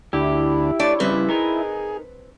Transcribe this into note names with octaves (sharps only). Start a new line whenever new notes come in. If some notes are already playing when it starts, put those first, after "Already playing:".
D2 D4 E4 G4
A3 D4 C#5 D5
F2 C#3 G3 C4 B4
D#4 G#4 A#4